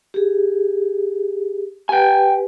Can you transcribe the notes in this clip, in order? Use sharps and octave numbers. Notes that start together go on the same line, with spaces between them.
G4 G#4
G4 B4 G5 G#5